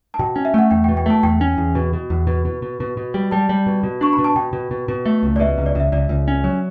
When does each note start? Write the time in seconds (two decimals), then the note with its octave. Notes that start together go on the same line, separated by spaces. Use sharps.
0.14 A5
0.19 B2 G5
0.36 C#4
0.45 E5
0.54 A3 F#5
0.71 E2 G5
0.84 G5
0.88 B2
0.97 G5
1.06 A3 A5
1.23 E2 G5
1.41 C#4
1.58 E2
1.75 B2
1.93 B2
2.10 E2
2.27 B2
2.45 B2
2.62 B2
2.80 B2
2.97 B2
3.14 G3
3.31 G3 A5
3.49 G3
3.66 B2
3.83 B2
4.01 D4 C#6
4.13 B5
4.18 B2
4.24 A5
4.36 B2 G5
4.53 B2
4.71 B2
4.88 B2
5.06 A3
5.23 C#2
5.36 D5
5.40 B2 E5
5.58 C#2
5.66 D5
5.75 C#2 E5
5.92 C#2 D5
6.09 C#2
6.28 C#4
6.44 F#3